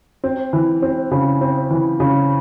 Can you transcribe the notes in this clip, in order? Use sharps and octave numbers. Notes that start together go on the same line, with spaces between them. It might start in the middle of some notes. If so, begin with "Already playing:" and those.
C4
E3
C4
C#3
C4
E3
C#3